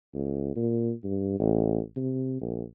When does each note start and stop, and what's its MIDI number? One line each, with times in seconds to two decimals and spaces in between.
0.14 0.55 37
0.56 0.92 46
1.04 1.39 43
1.40 1.80 33
1.96 2.36 48
2.41 2.63 34